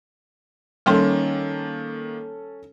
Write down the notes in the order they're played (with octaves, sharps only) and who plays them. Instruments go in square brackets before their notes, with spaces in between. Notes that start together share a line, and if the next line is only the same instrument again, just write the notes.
[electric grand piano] D#3 A#3 [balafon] G3 G5 C6 [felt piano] C#4 A4